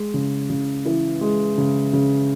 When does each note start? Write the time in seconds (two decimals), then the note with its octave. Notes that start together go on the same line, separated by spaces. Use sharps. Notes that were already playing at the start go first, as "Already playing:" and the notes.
Already playing: G#3
0.14 C#3
0.50 C#3
0.85 E3
1.21 G#3
1.58 C#3
1.93 C#3